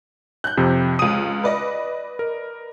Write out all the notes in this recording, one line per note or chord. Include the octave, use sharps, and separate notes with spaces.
F#6 G6
F2 C3
C#2 D#6 D#7
B4 D5 D#5
A#4